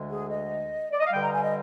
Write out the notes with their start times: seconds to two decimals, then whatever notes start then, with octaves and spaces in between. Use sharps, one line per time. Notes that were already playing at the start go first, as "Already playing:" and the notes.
Already playing: D2 D3 G#3
0.11 G#4
0.31 D#5
0.92 D5
1.00 D#5
1.06 F5
1.13 G2 D3 G3 G5
1.23 A#5
1.34 G#5
1.44 D#5